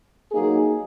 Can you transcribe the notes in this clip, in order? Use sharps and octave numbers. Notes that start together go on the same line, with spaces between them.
F#3 A#3 D#4 G#4